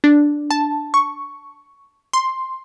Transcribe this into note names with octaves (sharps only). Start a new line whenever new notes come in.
D4
A5
C#6
C6